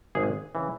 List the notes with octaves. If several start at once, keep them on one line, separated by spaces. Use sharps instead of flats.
G#1 G#4
C#3 E3